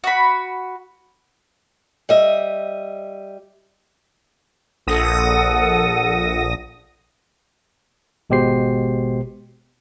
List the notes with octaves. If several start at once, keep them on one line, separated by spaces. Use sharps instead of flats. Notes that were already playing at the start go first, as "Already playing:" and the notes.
F#4 B5
G3 D#5 E5
A#1 A4 F#5 D#6 A#6
G#1 B2 G#3 G4 C5 C7